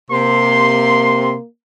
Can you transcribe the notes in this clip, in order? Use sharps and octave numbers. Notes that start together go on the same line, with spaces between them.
C3 A#3 C6